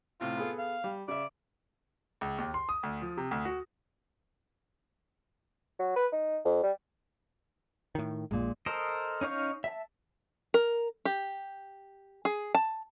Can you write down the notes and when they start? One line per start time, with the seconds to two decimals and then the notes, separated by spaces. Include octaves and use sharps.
0.21 A2 C3 F4
0.37 B3 G#4 A4
0.58 F5
0.84 G3
1.08 C#3 D5 E5
2.21 C#2
2.38 D#2
2.54 C6
2.69 D#6
2.83 D2
3.01 F3
3.17 C3
3.31 D2
3.45 F#4
5.79 F#3
5.96 B4
6.12 D#4
6.45 F2
6.63 G3
7.95 A2 D#3
8.31 A#1 A#2 G#3
8.66 A4 A#4 C5 D#5
9.21 C#4 D#4 F5 C#6 G6
9.64 E5 A5
10.54 A#4
11.05 G4
12.25 G#4
12.55 A5